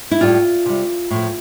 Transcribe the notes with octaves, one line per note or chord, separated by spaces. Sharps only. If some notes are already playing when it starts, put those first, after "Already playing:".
E4
A2 G3 F4
C3 G3
A2 F3 A3